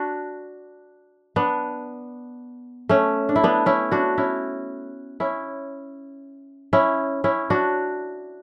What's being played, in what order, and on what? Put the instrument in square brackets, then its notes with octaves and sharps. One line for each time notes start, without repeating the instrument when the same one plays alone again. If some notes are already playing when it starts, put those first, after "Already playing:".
Already playing: [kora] D4 F#4
B3 D4
A3 C#4
D4
E4
B3 D4
C#4 E4
D4 F#4
C#4 E4
C#4 E4
C#4 E4
C#4 E4
D4 F#4